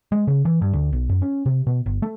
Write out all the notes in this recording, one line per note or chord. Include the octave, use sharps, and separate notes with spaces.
G#3
C#3
E3
G2
D2
B1
F#2
C#4
C3
B2
G1
A3